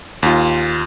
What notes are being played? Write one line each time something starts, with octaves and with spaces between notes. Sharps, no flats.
D#2 F4